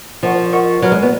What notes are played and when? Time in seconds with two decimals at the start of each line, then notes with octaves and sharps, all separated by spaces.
0.23 F3 A#4 D#5 F#5 C#6
0.53 A#4 D#5 F#5 C#6
0.82 F#3 B4 F#5 B5 F6
0.92 G#3
1.02 B3